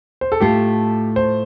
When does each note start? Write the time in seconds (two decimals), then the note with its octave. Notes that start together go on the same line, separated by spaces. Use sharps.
0.21 C5
0.32 A4
0.40 A2 A3 F4 G4
1.16 C5